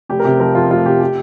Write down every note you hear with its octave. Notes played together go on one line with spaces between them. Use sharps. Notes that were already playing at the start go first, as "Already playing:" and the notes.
F1 G4
A#4
C3 G4
F3 A#4
F2 F4
F1 F4
C3 G4
G4